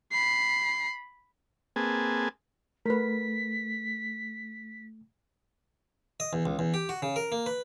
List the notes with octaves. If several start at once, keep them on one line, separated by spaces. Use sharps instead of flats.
B5 C7
A#3 C4 G#4 B4 G#5 A5
A3 A#4 B4 B6
D#5
E2
C#2
E2
G4
F#4
C#3
A#4
A#3
B4